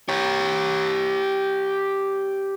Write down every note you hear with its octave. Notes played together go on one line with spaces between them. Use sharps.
G4 C#5